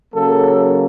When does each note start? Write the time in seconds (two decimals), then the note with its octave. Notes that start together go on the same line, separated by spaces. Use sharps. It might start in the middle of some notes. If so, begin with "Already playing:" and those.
0.14 C#3 F#3 A#3 A4